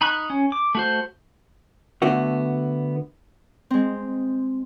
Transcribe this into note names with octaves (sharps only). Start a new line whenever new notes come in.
D#4 B5 C#6 F#6
C#4
D6
A3 F#4 C5
D3 A3 B3 F#4
G#3 C4